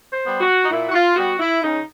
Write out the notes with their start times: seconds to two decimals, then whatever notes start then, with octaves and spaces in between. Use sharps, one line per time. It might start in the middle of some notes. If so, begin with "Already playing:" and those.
0.11 C5
0.25 G3 B3
0.41 F#4
0.63 D#4
0.71 A#2 E4
0.88 F#4
0.94 F4
1.16 G3 B3 F#4
1.39 E4
1.62 C#3 D#4